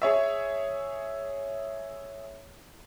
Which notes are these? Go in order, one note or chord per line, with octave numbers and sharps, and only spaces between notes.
G#4 C#5 E5